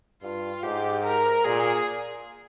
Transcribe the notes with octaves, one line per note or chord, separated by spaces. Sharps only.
G2 F4
G#2 G4
A#4
A#2 G#4